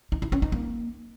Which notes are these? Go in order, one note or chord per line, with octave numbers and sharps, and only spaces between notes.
D#4
E4
C#4
D#4
A#3